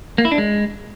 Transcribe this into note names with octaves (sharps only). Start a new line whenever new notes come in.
A#3
E4
D4
G#3